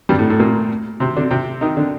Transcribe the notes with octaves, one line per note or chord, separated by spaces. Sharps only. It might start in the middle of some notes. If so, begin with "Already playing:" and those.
G2 G3
A2 A3
A2 A3
A#2 A#3
C3 C4
D3 D4
C3 C4
D#3 D#4
D3 D4